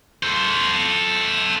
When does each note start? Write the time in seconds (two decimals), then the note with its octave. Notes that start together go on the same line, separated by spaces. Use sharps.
0.23 A4 C5